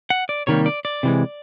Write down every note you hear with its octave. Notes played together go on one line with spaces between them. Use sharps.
F#5
D5
C3 D#3 G3 A#3 C#5
D5
D5
C3 E3 G#3